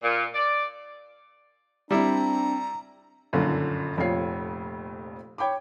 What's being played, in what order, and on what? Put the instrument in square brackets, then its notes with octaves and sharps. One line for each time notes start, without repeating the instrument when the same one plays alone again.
[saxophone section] A#2
D5
[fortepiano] G3 E4 [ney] C4 [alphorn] D4 [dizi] A#5
[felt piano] G1 F#2 A#2 D3 D#3
F1 F2 A#2 F4 C#5 C7
C#5 G5 B5 D6